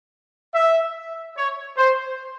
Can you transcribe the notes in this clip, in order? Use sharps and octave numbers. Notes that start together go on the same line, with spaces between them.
E5
C#5
C5